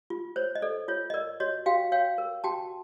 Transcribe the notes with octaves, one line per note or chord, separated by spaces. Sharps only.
F4
C5 C#5
D#5
A4 D5
F4 C#5
D#5
A#4 D5
F#4 C#5 D#5
F#4 F5 G5
C#5 F5 G5
A#4
F#4 G5 A5